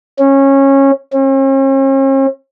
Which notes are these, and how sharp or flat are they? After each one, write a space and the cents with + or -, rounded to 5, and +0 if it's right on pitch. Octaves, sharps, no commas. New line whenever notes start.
C#4 -20
C#4 -45